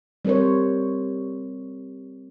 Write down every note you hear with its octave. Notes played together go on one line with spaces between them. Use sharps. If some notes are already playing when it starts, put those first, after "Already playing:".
G3 C4 A#4 C5 C#5